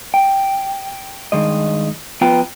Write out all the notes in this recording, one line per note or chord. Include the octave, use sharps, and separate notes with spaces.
G5
G2 D#3 G#3 D#5
F3 B3 F4 B4 G5 A#5